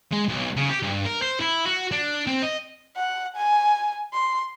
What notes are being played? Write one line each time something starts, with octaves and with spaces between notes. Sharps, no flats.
G#3
B1
C#3
G4
G2
A#4
C5
E4
F#4
D4
C4
D#5
F#5
G#5
C6